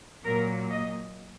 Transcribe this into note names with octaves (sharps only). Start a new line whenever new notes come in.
A#2 F#3 A#3 A#4
D#5